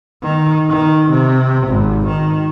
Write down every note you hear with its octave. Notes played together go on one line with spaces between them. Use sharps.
D#3
D#3
C3
G#1
D#3